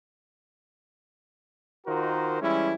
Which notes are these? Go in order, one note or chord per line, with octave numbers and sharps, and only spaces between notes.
D#3 D#4 F4 F#4 A#4 C5
E3 G3 G#3 C#4 E4